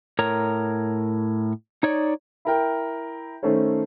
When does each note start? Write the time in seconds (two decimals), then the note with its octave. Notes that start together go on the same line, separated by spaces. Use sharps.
0.19 A2 A#4 C#5 A#5
1.83 D#4 C#5 D5
2.45 E4 A#4 G5
3.43 D#3 A3 C#4 A4 C5 C#5